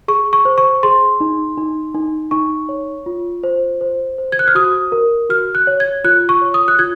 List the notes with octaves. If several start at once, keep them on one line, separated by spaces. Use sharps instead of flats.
G#4 C#6
C#6
C5
C#6
G#4 C6
D#4
D#4
D#4
D#4 C#6
C#5
F4
C5
C5
C5
G#6
F#6
F6
F#4 D#6
A#4
F#4 F6
F#6
C#5
G#6
F4 F#6
C#6
C#5
D#6
F#6
F4 G#6